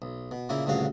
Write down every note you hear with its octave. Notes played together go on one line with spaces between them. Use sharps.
B1
B2
A#2 C#3 A#3 E4
D2 G2 A#2 C#3 F#4 F5